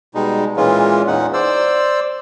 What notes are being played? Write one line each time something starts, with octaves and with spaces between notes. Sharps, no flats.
B2 G3 G#3 D#4
A#2 E3 G#3 C#4 F4
E2 A#2 C#4 D#4 F#5
C5 D5 E6